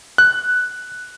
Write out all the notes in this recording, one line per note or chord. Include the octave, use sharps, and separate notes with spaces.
F#6